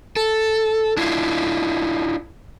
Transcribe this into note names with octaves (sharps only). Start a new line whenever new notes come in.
A4
D4 E4 F4